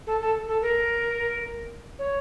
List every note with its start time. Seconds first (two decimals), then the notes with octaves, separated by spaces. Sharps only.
0.07 A4
0.21 A4
0.48 A4
0.62 A#4
1.99 C#5